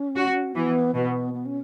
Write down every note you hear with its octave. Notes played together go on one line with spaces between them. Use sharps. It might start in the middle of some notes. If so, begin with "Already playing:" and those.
Already playing: C#4
F#4
E3 B3
B2 B3
B3
C#4